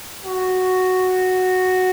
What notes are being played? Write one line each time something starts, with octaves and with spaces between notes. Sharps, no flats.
F#4